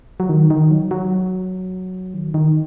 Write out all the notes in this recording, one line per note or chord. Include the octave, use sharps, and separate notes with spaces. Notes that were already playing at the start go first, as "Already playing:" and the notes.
F#3
D#3
D#3
F#3
F#3
D#3
D#3